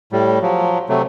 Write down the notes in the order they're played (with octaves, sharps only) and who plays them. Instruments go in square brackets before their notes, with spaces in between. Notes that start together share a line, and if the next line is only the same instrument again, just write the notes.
[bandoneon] A2 G3
F3 F#3
C3 F#3 A3